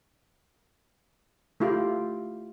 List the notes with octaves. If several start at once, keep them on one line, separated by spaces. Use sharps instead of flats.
A3 E4 F4 G4